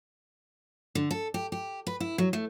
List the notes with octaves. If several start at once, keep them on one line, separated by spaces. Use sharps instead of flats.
D3
A4
G4
G4
B4
E4
F#3
A3